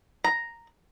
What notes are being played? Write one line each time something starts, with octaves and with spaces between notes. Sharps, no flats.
A#5